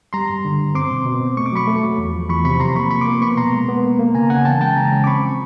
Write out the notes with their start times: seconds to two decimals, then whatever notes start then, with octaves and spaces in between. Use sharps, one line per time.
0.13 G3 A#5 C6
0.29 G2
0.45 D3
0.59 G2
0.75 C4 C6 D6
0.91 B2
1.05 B2
1.21 C4
1.37 A3 C#6
1.46 D6
1.52 F#3 B5 C#6
1.67 A3
1.83 F#3
1.98 E2
2.14 F3
2.29 E2 B5 C#6
2.45 C3 B5 C#6
2.60 C3 A#5 C6
2.75 A#3 B5 C#6
2.91 F3 B5 C#6
3.01 C6 D6
3.07 A#3
3.22 B3 B5 C#6
3.37 B2 A#5 C6
3.53 G#3
3.68 B3
3.84 A#3
3.99 A#3
4.15 C#3 G#5 A#5
4.30 C#3 F#5 G#5
4.45 E3 G5 A5
4.61 G#3 G5 A5
4.76 C#3 G#5 A#5
4.92 C#3
5.04 D6
5.07 C4 B5 C#6
5.22 F3